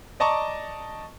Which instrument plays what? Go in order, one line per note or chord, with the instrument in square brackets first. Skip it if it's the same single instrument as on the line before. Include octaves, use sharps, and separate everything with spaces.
[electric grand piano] D5 D#5 A5 A#5 C#6 D6